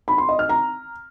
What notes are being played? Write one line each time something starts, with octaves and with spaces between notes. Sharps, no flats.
B5
C6
D#5
F6
A#5